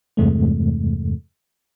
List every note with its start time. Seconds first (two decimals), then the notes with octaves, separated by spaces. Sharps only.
0.17 E2 G2 C3 E3 G#3 A3